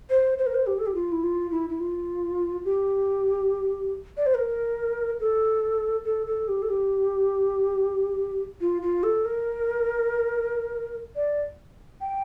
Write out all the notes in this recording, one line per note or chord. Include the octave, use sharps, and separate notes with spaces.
C5
C5
A#4
C5
G4
A4
G4
F4
E4
F4
E4
E4
F4
G4
D5
C5
A#4
A4
A4
A4
G4
A4
G4
F4
F4
A4
A#4
D5
G5